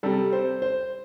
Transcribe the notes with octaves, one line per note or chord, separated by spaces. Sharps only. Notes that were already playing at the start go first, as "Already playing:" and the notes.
C3 G3 A4
C5
C5